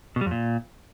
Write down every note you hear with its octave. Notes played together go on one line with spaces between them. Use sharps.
B2
G3
F2
A#2